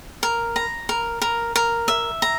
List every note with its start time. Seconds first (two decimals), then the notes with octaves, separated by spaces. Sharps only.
0.23 A#4
0.56 A#5
0.89 A#4
1.22 A#4
1.56 A#4
1.88 E5
2.22 A#5